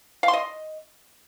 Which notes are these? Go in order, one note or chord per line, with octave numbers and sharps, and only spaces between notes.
F5
C6
D#5